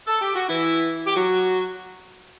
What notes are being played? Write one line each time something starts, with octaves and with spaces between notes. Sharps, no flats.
A4
G4
F#4
E3 E4
G4
F#3 F#4